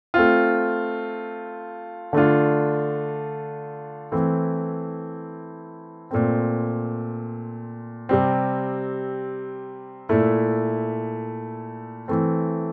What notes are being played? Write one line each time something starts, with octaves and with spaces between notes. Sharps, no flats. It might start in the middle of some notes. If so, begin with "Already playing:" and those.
A3 C4 F4
D3 A3 D4 F4
E3 A3 C4 E4
A#2 A3 C4
C3 G3 C4
A#2 A3 E4
E3 A3 C4